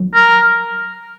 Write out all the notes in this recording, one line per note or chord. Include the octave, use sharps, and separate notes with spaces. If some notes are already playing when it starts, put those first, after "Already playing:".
Already playing: A#1 D#3 F#3
A#4